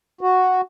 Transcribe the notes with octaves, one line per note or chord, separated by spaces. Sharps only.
F#4